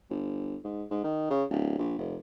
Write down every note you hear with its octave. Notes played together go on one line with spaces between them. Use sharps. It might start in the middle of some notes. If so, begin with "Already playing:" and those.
G1
G#2
G#2
D#3
C#3
D1
A#1
F1